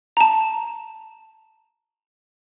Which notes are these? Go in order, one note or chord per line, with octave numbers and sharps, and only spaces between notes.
A5 A#5